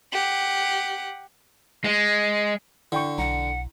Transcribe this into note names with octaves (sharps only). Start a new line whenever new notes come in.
G4 F#5
G#3
D3 E4 G5 C#6
B1 F#5 A#5